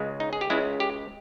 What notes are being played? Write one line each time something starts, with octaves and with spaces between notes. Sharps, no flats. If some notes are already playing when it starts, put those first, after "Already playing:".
Already playing: C#2 C#3 G#3
D#4
G#4
G4
C#2 C#3 G#3 E4
G4